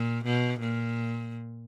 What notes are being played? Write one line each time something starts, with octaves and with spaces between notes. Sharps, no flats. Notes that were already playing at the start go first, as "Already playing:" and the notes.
Already playing: A#2
B2
A#2